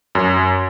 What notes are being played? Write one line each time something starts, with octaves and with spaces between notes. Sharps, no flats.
F#2